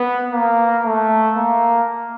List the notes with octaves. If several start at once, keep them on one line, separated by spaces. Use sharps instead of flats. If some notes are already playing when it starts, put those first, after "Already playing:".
Already playing: B3
A#3
A3
A#3